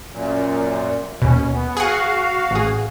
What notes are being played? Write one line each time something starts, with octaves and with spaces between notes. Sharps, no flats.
F#2 A#2
D#2 B2 C#4
B3
F#4 G#4 F5 F#5
A1 G#4